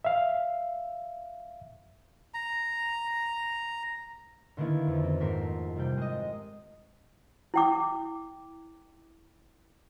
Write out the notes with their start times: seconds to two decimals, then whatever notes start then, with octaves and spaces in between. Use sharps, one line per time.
0.05 E5 F5
2.34 A#5
4.57 D3 D#3 A#3 B3 E4
4.87 F2
5.04 C4
5.20 G#2 A3 A#4 C6 B6
5.76 C3 G3 G5
5.97 G#3 D#5
7.54 E4 G5 D6